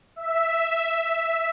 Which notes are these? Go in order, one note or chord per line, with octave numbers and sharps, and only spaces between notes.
E5